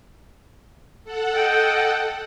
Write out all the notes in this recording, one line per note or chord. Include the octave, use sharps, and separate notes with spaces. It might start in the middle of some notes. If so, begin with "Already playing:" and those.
A4 F#5
D#5 G5